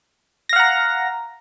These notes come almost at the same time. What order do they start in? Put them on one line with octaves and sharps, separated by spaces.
A#6 F5 F#5 A#5